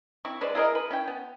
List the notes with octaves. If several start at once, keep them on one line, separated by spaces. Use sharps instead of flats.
C4 E4 C#6
G#3 B4 C5 D5
E4 G#4 A#4 D#5
B4
C#4 E4 G5
B3